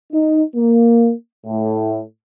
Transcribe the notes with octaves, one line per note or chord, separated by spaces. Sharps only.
D#4
A#3
A2